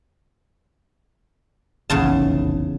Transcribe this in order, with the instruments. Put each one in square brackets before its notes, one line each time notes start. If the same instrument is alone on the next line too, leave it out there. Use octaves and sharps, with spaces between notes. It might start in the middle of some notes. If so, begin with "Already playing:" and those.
[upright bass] F1 A#1 [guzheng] E2 C#3 A5